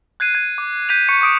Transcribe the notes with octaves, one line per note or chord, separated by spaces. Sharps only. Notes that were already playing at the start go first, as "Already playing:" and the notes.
F#6 G#6 C7 D#7
G#6
D6
G6 B6 D#7 F7
C#6 C#7
D6 D#6 D7